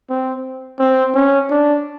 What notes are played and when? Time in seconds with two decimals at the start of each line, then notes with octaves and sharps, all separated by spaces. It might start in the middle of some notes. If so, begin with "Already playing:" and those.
0.10 C4
0.79 C4
1.14 C#4
1.50 D4